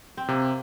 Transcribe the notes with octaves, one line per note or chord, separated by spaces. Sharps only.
C4
C3 A#3